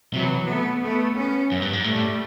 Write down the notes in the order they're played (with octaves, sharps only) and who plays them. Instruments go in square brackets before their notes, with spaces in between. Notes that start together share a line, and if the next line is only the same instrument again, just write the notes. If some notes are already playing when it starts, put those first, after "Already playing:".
[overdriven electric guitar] C3 [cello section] E3 F#3
[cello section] A3 B3
A3 B3
B3 C#4
[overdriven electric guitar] F#2
G2
G#2
[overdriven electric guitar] A2 [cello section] G3 A3
[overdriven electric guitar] A2